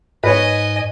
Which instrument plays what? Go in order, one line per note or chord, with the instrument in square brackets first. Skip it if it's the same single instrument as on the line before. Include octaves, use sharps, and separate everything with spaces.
[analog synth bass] G#2 [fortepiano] B4 C#5 [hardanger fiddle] D#5 G#5